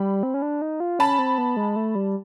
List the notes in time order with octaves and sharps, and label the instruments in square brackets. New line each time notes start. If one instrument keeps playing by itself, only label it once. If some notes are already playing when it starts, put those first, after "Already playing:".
Already playing: [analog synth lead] G3 [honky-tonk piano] B5
[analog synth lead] C4
C#4
D4
D#4
F4
[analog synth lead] C#4 [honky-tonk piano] A5 B5
[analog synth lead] C4
B3
G#3
A3
G3